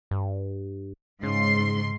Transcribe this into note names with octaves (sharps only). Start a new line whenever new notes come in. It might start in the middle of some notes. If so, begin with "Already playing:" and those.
G2
G#2 C#3 C6